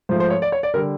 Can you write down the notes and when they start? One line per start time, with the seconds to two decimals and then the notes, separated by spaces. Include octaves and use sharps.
0.09 G#2 F3 A3 C5
0.20 C5
0.30 C#5
0.42 D5
0.52 C#5
0.63 D5
0.74 D3 G3 A#4